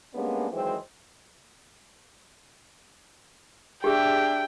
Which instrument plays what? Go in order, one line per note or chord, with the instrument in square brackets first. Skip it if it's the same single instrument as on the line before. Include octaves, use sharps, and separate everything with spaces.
[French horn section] G3 G#3 A#3 B3 C#4 D4
D#3 E3 F#3 G#3 C4
[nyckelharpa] D4 E5 [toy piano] G4 G#4 [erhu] G5